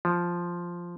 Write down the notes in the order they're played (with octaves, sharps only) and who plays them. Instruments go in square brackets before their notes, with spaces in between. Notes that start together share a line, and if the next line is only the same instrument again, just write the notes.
[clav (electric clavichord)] F3